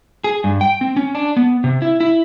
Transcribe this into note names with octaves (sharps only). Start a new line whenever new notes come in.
G#4
G2
G5
C4
C#4
D4
B3
C3
E4
E4